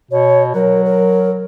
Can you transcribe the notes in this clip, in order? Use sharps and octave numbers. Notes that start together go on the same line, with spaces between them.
B2 C#5
F#3 A#4
A#4